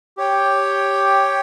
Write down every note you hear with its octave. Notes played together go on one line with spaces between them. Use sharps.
G4 C#5 G5